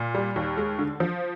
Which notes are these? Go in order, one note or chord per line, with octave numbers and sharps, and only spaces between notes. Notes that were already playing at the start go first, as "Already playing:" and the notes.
Already playing: A#2
G3
D#2
G#3
D3
F3